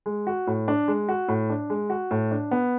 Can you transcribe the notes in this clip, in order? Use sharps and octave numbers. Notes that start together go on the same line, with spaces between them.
G#3
F#4
A2
D4
G#3
F#4
A2
D4
G#3
F#4
A2
D4
B3